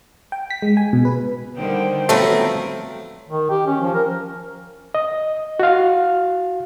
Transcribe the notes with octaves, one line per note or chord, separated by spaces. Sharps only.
G5
B6
G#3
G#5
B2
B4
D3 D#3 G3 C5 G5
F3 F#3 A3 B3 C4
D#3
G4
C#4
F3
A#4
D#5
F#4 F5